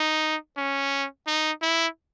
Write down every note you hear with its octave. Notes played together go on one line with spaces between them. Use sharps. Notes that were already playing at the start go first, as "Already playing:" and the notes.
Already playing: D#4
C#4
D#4
E4